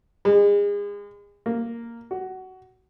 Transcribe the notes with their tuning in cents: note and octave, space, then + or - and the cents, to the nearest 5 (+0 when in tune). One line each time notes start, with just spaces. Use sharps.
G#3 -30
A#3 -5
F#4 +15